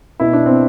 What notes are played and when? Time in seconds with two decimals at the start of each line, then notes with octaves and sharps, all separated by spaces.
0.20 B2 E4
0.33 D4
0.46 C4